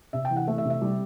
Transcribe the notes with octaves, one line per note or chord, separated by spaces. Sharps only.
C3 E5
G5
E3
F#5
A3 E5
E5
C3
E5
G3